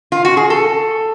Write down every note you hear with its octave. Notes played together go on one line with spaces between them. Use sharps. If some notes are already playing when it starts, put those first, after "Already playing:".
F4
F#4
G#4
A4